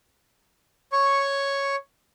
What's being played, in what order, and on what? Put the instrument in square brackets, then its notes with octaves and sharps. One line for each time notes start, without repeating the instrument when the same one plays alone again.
[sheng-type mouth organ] C#5 C#6